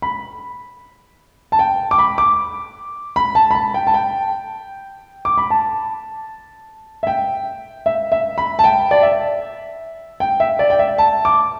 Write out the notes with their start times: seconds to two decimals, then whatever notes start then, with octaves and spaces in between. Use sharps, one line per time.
0.02 B5
1.52 A5
1.59 G5
1.91 D6
1.98 B5
2.18 D6
3.16 B5
3.35 A5
3.51 B5
3.55 A5
3.74 G5
3.87 A5
3.94 G5
5.25 D6
5.38 B5
5.50 A5
7.03 E5
7.07 G5
7.86 E5
8.12 E5
8.38 B5
8.59 A5
8.64 G5
8.91 D5
9.03 E5
10.20 G5
10.40 E5
10.59 D5
10.70 G5
10.79 E5
10.98 A5
11.25 D6